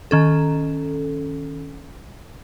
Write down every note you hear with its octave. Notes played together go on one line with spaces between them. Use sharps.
D#3 C#4 A4